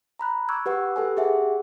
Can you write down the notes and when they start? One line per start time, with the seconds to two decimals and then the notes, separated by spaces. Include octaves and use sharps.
0.19 A#5 B5 F#6
0.49 C#6 D6 E6 F#6 G#6
0.66 G4 B4 F#5 E6 F#6
0.96 G4 A4 B4 G#5
1.17 G4 G#4 E5 F#5 G#5